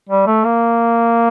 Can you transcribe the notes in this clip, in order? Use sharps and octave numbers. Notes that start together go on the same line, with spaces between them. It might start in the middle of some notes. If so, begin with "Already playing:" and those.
G3
A3
A#3